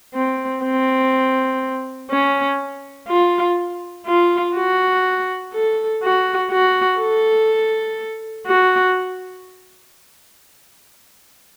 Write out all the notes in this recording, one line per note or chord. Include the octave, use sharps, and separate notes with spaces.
C4
C4
C#4
F4
F4
F#4
A4
F#4
F#4
A4
F#4